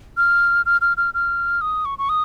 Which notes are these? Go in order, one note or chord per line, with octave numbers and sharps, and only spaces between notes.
F6
F6
F6
F6
F6
D#6
C#6
C#6
D#6